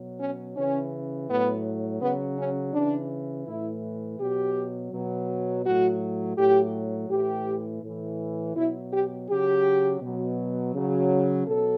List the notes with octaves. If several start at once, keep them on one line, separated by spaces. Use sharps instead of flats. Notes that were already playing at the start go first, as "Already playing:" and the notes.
Already playing: B2 F#3
C#4
C#3 E3 C#4
A2 F#3 B3
C#3 F#3 B3
C#4
C#3 E3 D4
A2 E3 E4
B2 F#3 G4
B2 F#3
A2 F#3 F#4
A2 F#3 G4
A2 E3 G4
A2 E3
B2 F#3 E4
G4
C#3 F#3 G4
B2 F#3
C#3 F#3
B2 F#3 A4